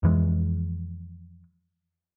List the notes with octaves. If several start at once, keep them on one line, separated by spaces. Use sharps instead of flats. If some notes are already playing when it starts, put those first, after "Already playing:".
F2 E3 G#3